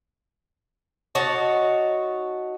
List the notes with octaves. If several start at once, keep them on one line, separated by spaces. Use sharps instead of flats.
D#4 F#4 C#5 A5